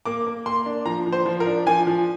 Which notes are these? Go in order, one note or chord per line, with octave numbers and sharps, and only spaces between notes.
A#3 D6
A#3
A#3 C6
D4
F3 A#5
F3
C5
F3
A#4
D4
F3 G#5
F3